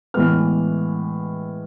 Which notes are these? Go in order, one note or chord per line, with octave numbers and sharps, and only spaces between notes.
A2 E3 G#3 B3 F6